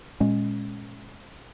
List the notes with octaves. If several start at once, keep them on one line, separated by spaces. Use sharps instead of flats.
A#2 G#3 C#4